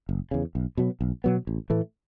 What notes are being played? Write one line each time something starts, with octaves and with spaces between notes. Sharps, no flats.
F#1
E2 C#3
B1
B2 F#3 B3
B1
B2 F#3 B3
A1
A2 E3 A3